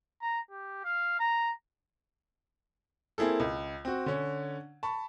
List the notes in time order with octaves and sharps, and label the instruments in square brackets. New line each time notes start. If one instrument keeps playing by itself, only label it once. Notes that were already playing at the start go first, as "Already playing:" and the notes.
[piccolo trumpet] A#5
G4
F5
A#5
[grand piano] A#3 C4 E4 G#4 A4
C#2
C4 F#4
D3 C#4
A5 B5 C#6